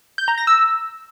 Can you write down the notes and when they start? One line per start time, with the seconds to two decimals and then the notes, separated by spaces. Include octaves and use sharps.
0.18 G6
0.28 A#5
0.38 A#6
0.47 E6